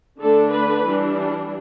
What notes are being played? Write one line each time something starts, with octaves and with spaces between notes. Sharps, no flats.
D3 A3 D4 A4
B4
E3 G3 D4